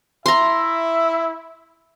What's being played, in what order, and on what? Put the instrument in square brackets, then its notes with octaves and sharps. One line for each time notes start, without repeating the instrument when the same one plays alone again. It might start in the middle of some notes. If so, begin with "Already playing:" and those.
[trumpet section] E4 E5 [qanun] A#5 C6